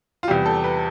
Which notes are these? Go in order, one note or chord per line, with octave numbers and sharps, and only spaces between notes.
F4
E2 C3 G3 G4
A4
B4